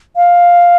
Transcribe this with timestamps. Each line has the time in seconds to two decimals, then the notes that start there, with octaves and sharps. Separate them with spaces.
0.16 F5